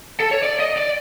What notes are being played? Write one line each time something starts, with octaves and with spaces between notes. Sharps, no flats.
A4
C#5
D5
D#5
D5